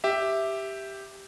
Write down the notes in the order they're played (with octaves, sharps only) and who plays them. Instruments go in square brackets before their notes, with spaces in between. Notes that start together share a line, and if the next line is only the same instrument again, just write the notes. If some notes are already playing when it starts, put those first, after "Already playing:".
[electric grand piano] G4 E5